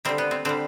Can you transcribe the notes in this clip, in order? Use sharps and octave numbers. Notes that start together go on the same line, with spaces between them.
D3 G3 C4
B3
C4
D3 G3 C4